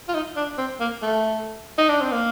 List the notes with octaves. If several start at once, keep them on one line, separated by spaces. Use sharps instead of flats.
F4
D#4
D4
C4
A#3
A3
D#4
D4
C4
A#3